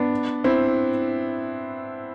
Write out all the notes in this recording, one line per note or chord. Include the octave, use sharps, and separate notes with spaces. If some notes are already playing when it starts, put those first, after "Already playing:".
Already playing: B3 D4
C4 E4